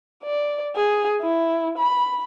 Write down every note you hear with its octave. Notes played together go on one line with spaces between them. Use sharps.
D5
G#4
E4
B5